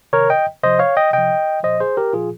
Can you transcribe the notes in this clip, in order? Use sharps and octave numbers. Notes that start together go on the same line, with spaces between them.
C3 D#3 A#4 C#5
D#5 G5
C3 F3 C5 D#5
C#5 F5
D#5 G5
C3 F3 D#5 G5
A#2 F3 C5 D#5
G#4 C5
G4 A#4
A#2 F3 F4 G#4